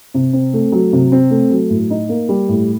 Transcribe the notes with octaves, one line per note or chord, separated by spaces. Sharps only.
C3
C4
A3
F#3
C3
C4
A3
F#3
A2
D#4
A#3
G3
A2